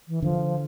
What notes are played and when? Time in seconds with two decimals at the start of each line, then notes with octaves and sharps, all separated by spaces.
0.08 E3
0.22 D3 F3